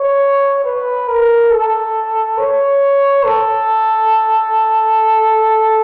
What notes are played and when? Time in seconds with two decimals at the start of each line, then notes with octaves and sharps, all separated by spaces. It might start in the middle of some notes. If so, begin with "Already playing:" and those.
Already playing: C#5
0.64 B4
1.08 A#4
1.51 A4
2.38 C#5
3.24 A4